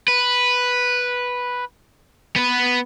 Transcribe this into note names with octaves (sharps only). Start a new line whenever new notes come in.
B4
B3 B4